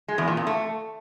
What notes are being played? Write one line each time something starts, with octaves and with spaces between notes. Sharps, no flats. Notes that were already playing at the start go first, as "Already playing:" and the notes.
G#3
E2
A#2
F2
A3